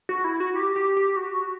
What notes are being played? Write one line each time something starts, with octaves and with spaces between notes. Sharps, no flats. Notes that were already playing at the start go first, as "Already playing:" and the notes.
F#4
E4
F#4
G4
G4
G4
F#4